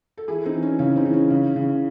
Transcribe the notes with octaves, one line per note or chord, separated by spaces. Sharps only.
A4
E3 E4 G#4
C4 D#4
E3
C#4
C#3 C#4
C4 D#4
E3
C#4
C#3
C#3